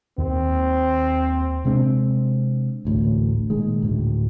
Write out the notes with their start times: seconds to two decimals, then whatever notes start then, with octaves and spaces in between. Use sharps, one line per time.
0.18 D#2 C4
1.65 C3 G#3 C4 D4
2.85 A1 D2 A2
3.50 A#2 D#3 G#3
3.82 D2 A2